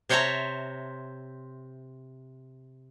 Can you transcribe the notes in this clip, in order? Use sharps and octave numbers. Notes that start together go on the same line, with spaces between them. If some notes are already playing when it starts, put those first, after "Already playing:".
C3 C5 C#5 E5 A5 A#5